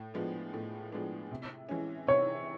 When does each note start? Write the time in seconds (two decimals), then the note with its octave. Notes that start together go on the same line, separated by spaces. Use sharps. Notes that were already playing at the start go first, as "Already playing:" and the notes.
Already playing: A2
0.14 F3 G#3 B3 D4
0.54 A2
0.92 F3 G#3 B3 D4
1.31 C3
1.69 E3 G#3 C#4
2.07 C3 C#5